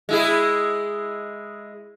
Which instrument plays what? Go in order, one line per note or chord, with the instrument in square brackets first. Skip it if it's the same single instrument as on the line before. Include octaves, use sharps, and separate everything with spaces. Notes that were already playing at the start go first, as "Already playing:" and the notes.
[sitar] G#3 E4 G#4